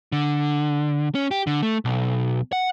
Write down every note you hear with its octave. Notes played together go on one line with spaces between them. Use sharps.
D3
C#4
G4
D3
A3
B1
F#5